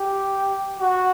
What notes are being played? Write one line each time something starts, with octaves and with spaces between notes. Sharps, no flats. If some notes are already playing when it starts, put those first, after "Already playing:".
Already playing: G4
F#4